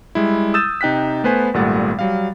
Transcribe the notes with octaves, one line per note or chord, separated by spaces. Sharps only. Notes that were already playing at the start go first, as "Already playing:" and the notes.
G3 G#3 E4
D#6 E6 G6 A6 E7
C3 D#4 G5 F#6 B6
A3 B3 B4 C5 G#5
G#1 A#2 G3 A3 F#5 A6
F#3 G3 F5